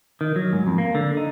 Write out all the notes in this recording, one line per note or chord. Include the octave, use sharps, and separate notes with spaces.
D#3
F#3
G#2
F2
A#3
D3
D#4